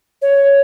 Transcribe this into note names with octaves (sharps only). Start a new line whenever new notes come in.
C#5